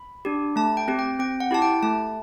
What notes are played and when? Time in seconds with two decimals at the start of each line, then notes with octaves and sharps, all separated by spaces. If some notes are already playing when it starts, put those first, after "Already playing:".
Already playing: B5
0.25 D4 G4
0.56 A3 A5
0.77 G5
0.88 C4 G4
0.99 G5
1.19 C4 G5
1.40 F#5
1.51 E4 G4 A5
1.62 G5
1.83 A3 A5